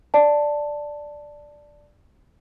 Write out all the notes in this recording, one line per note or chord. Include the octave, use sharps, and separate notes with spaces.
D5 A5